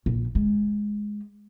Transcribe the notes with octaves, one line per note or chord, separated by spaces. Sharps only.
A#1
G#3